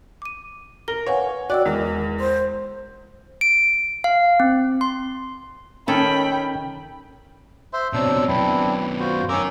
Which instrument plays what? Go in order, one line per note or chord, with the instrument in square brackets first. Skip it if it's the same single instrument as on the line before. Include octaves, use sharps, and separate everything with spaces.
[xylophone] D6 D#7
[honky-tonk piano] A#4 [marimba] A#6 [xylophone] G7
[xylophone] B4 [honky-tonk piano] C#5 [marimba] F5 F#5 G#5
[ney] F#4 [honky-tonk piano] D5 [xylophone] D#5 G5 E6 [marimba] F#6
[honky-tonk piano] E2 [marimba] G#3 [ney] A#4
[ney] C5 [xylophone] C6
[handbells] D7
F5
C4
C6
[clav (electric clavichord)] D#3 A4 [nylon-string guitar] C#4 [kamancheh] G5 B5
[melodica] C5 E5 C6
[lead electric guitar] B2 C4 [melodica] F#3 D4 E6
[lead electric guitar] F#2 B3 [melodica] C4 D4 E4
[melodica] F4 F#4 C5
[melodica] C#4 D6 E6 [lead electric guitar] D#4 A#4